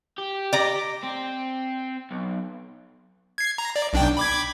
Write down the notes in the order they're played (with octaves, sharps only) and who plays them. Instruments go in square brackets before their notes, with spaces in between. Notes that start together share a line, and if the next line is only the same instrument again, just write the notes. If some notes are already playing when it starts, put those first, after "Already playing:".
[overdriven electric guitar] G4
[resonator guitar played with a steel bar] D5 A#5
[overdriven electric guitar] C4
B1
[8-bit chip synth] G#6 C7
A#5
D5
B1 D4 G5
B5 D6 G#6